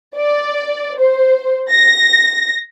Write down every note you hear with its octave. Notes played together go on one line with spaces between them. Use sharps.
D5
C5
A#6